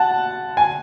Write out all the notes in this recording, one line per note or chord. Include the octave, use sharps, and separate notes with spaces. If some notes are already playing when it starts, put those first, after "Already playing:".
Already playing: F#5 A5 F#6
G#5